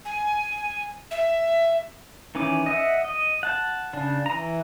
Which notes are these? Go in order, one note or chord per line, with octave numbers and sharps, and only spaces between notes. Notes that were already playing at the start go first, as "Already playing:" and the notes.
G#5
E5
D#3 E3 C#4 G#5 D6
D#5 E5 F#5
D#5
F#5 A5
C#3 D4
E3 A#5